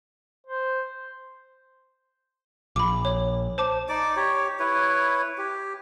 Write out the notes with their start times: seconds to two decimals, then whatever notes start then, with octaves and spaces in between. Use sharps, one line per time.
0.46 C5
2.76 A#1 B5 D6
3.05 C#5
3.58 C5 A5 D6
3.89 D#4 D5 D6
4.16 G4 C#5
4.59 E4 B4 C#5
5.38 G4